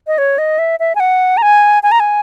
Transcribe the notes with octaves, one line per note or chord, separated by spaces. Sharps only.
D#5
C#5
D#5
E5
E5
G#5
F#5
A#5
G#5
G#5
A#5
G#5